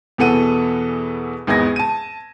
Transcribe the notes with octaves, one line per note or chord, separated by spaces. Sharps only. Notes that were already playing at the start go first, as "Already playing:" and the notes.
E2 B2 E3 A4 F#5 D#7
G#1 E2 B3 G#6 A#6
A5 D#7